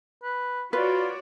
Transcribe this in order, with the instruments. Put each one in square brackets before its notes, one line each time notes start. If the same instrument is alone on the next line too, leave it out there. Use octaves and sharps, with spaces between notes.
[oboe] B4
[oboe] F4 [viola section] F#4 C#5 D5 [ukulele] B4